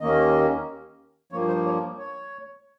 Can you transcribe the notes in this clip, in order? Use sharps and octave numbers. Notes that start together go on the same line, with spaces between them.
D#2 D#3 A#3 C#4 D#5
G2 F3 A#3 C#5
C5
C#5
C#5